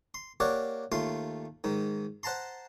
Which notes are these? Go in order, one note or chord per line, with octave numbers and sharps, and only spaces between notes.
C6
A#3 G4 A#4 C#5 D5 F#5
D#2 A3 F4 C6
G#2 D#3
C5 F#5 A5 A#5 C6